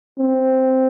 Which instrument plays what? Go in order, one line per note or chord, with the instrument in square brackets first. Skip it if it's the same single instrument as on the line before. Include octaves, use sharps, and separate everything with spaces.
[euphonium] C4